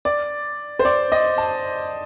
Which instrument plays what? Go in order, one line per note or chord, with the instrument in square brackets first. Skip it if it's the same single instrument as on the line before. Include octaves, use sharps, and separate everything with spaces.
[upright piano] D5
C5
D5
D#5
A5